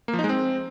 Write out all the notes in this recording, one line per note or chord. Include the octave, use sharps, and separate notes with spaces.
A#3
F3
D#4
G#3
C4